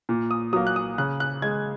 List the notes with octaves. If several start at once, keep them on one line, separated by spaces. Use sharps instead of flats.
A#2
D#6
F#3 A#3 D#6
F#6
D#6
C#3 F#6
F#6
G#3 G#6